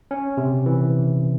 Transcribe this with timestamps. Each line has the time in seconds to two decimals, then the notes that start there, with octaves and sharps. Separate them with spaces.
0.11 C#4
0.37 C3
0.66 E3